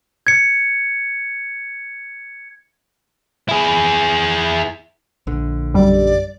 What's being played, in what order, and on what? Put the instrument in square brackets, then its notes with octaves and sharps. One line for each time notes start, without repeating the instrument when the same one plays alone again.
[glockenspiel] G#6 C#7
[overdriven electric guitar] E4 G#4
[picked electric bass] A#1 D3
[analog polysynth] F#2 G3 [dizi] D5